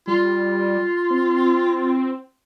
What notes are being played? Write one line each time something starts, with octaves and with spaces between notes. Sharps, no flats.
G3 F4
C4